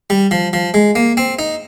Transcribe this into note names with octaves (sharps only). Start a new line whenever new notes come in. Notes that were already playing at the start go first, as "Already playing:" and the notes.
G3
F3
F3
G#3
A#3
C4
D#4